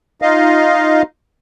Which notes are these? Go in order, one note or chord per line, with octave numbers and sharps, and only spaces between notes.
D#4 F4 D#5 F5